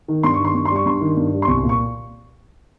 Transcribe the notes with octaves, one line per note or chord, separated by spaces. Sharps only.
D#3
G2 C6
C#6
D#3 C6
G2 C#6
G3 C6
C#6
G2 C6
D#3
G2
G3
C6
C2 C#6
A#2
C#6